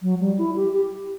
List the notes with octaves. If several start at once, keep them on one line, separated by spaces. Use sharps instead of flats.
F#3
G3
E4
G4
G4